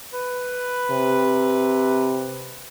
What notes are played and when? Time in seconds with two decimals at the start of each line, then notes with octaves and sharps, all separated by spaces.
0.13 B4
0.91 C3